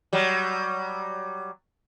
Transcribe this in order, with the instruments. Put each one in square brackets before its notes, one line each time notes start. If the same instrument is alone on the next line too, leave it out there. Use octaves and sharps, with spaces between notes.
[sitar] F#3 G3